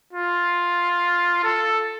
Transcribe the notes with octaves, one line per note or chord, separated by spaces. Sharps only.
F4
A4